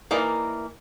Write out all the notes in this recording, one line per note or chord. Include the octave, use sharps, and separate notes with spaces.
E3 A#3 D#4 A#4 D5